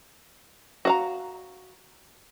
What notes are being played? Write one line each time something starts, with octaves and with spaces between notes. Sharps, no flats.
F#4 F5 A#5